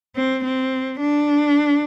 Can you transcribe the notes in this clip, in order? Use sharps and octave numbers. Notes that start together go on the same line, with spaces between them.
C4
C4
D4